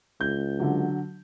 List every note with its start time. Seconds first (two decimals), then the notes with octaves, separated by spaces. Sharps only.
0.21 C#2 G6
0.60 D3 F#3